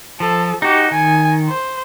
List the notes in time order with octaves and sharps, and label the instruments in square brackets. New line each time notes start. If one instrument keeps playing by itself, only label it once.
[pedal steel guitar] F3 [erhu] A4
[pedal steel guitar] D#4 F#4 [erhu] G4
[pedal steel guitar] D#3 [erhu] G#5
[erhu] C5